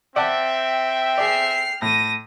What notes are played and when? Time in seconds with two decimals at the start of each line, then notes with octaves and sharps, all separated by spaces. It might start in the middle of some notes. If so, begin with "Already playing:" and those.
0.16 C4 D5 E5 F#5 G5 A5
1.18 G#4 D5 F6 C7
1.82 A2 A#6 D#7